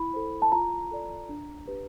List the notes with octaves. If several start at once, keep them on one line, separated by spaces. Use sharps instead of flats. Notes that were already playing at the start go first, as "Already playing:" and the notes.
Already playing: E4 B5
A4 C5
A5
F4 A#5
A4 D5
D4
G4 B4